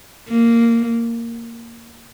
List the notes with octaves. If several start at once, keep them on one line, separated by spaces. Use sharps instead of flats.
A#3